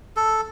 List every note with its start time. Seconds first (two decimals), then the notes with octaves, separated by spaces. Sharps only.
0.17 A4